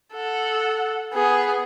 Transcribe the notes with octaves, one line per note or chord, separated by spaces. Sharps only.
A4 F#5
B3 G#4